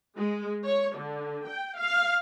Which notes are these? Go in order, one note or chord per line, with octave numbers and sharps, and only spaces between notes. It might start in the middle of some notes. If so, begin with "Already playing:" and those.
G#3
C#5
D3
G5
F5